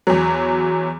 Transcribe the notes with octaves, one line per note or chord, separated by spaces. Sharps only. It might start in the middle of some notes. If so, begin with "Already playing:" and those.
E2 F#3